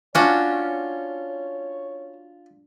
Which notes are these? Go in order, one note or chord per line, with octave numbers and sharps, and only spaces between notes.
C#4 D4 F4 F#4 C#5